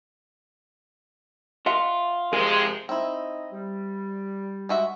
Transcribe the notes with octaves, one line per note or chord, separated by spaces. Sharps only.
F4 D#5 E5 F#5
F2 C3 G#3 G#4 A#4 G#5
C4 D#4 E4 D#5
G3
G#3 F#4 E5